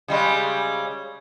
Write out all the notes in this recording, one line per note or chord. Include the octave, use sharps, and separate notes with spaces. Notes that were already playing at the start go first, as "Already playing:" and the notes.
C#3 G3 G#3